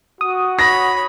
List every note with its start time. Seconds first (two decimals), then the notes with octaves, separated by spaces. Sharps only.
0.21 F#4 D#6
0.59 C#5 B5 A#6